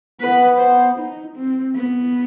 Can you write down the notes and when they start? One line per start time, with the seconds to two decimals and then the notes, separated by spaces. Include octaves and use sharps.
0.21 B3 B4
0.59 C5
0.98 D#4
1.36 C4
1.76 B3